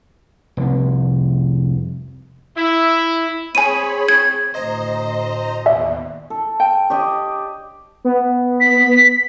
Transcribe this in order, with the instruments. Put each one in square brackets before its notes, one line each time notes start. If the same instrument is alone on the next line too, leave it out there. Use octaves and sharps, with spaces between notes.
[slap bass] F1 C2
[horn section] E4
[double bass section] C4 [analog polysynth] G#4 C#5 B5 [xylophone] G#5 D#7
[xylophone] G#6
[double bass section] D2 A2 [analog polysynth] C5 D#5 A#5
[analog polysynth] D#2 B2 [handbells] D5 E5 G#5
[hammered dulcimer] A4
[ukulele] G5
[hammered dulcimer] G4 D5 D#5
[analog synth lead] B3
[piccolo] B6